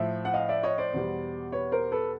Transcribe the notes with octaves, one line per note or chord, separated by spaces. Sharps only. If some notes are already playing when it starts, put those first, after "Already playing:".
Already playing: A2 F3 E5
F#5
D#5 F5
D5 E5
C#5 D#5
C5 D5
E2 B2 G3
B4 C#5
A#4 C5
A4 B4